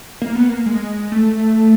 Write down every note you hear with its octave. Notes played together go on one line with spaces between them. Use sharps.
A#3
B3
A#3
G#3
A3